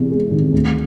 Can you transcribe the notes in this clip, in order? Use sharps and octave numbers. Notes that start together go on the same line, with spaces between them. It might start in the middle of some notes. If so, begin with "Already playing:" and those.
Already playing: E2 C3
G#3
D#3
D2